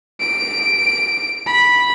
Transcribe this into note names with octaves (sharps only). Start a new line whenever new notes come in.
D7
B5